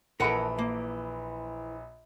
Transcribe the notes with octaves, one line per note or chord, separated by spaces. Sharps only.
A#1 E3 A4 A#4 F#5 B5 D7
A#3